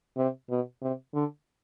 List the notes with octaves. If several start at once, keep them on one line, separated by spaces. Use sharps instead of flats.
C3
B2
C3
D3